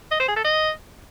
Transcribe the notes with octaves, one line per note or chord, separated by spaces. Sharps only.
D#5
C5
G#4
A4
D#5